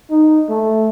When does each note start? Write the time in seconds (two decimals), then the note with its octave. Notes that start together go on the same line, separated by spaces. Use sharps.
0.10 D#4
0.49 A3